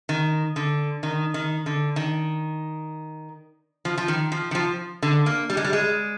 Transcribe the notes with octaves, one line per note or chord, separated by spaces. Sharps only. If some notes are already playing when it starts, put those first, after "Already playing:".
D#3
D3
D#3
D#3
D3
D#3
F3
F3
D#3
F3
D#3
F3
D3
A#3
G3
G#3
G3
G#3